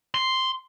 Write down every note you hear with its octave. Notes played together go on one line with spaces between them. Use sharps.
C6